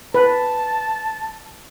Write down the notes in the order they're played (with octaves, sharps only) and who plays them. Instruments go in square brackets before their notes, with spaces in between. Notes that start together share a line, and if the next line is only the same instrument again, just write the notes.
[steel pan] B4 [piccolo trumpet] A5